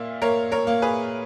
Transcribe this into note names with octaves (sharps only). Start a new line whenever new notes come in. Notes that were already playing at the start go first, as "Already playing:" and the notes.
Already playing: A#2 A#3 E5
A#3 A#4 C#5
A#4 C#5
A#3
G#4 B4